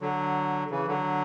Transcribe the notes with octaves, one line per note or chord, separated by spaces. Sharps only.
D3 F#3
C#3 E3
D3 F#3